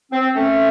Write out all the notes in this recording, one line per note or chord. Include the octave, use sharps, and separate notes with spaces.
C4
A3 C#4